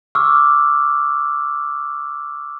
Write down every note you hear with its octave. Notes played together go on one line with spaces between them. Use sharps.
C#6 D6 E6 F6